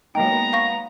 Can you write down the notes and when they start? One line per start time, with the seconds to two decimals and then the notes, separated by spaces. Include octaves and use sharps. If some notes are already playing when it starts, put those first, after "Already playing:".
0.15 F#3 G#3 A#3 B3 D#4 G5 A#5
0.53 F5 C#6 A#6